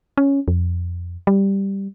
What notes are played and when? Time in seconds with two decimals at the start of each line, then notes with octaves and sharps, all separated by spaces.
0.18 C#4
0.48 F2
1.27 G3